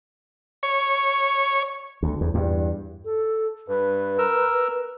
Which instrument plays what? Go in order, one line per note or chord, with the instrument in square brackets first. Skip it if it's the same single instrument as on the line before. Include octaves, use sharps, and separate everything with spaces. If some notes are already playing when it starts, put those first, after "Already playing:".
[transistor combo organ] C#5 C#6
[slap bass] D2
E2
E2 G2
[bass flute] A4
[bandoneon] G2 [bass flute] B4
[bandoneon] A#4 E6